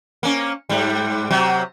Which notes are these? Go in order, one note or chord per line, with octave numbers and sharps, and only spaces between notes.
A#3 C#4
G#2 G3
C3 F#3